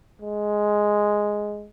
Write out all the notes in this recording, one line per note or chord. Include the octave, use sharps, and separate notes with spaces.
G#3